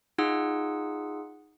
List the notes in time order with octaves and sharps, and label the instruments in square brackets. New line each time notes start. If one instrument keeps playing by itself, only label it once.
[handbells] D#4 F4 G#4 F#5 E6